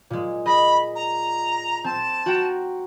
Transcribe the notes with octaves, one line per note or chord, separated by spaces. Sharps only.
A#2 G#3
G#4 D#5 B5
A#5
C4 A5
F#4 G5 A#5